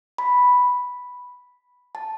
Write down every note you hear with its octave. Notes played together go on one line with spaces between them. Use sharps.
B5
A5